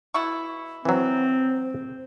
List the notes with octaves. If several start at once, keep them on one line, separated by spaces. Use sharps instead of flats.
B2 E4 C#6
E3 F#3 C4 C5